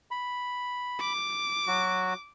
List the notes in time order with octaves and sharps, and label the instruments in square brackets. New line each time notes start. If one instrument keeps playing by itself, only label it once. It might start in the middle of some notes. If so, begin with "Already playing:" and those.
[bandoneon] B5
[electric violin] D6
[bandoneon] F#3 F#4